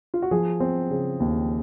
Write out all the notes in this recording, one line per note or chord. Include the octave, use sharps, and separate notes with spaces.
F4
F#4
F3 G#4
C4
C#3
D#2